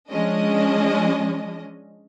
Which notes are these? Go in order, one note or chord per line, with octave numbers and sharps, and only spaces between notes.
F3 G#3 C#4 D4 D#5